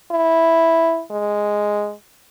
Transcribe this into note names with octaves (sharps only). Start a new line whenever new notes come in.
E4
G#3